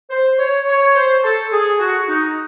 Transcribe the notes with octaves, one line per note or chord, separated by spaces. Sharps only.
C5
C#5
C#5
C5
A4
G#4
F#4
D#4